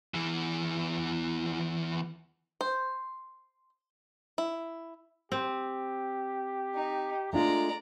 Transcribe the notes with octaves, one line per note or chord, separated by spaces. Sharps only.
E2 E3
C5
E4
C4 G4
D#4
G#3 A3 D4 F4 D5 A#5